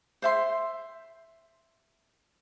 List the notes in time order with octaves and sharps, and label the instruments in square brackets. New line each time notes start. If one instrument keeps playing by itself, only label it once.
[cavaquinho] C5 E5 C6